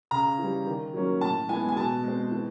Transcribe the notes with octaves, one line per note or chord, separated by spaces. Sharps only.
C#3 A#5
E3 G3
D#3
F#3 A#3 C#4
A2 A5
E3 G#3 B3 G#5
G#5
B2 A5
G#3 C4
E3